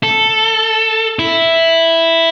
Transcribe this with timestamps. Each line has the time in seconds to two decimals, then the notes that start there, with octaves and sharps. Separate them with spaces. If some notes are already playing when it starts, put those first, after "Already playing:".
0.03 A4
1.19 E4